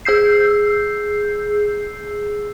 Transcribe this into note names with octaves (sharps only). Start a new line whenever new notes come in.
G#4 E6 G6 C7